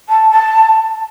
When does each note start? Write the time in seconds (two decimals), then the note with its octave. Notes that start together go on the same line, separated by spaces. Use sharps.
0.09 A5
0.30 A5